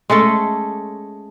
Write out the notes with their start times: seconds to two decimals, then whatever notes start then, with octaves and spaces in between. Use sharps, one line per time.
0.10 G#3 A3 C#4 A4